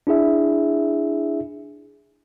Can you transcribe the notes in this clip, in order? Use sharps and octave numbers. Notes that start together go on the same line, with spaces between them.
D4 E4 G#4 E5